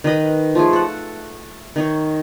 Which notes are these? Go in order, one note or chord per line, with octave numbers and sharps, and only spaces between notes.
D#3 B4 D#5 B5
F3 A3 G#4
A4 F#5
D#3 D#4 C#5